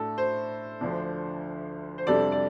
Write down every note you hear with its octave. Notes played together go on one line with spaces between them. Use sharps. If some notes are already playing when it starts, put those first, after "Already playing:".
Already playing: A2 A3 D4 A4
C5
D2 D3 F3 D4
C5
F2 C3 G3 D4 A4 D5
D5